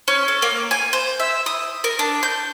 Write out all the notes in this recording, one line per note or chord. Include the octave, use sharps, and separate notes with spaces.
C#4
A4
A#3
G#5
C5
E5
D#6
A#4
D4
G6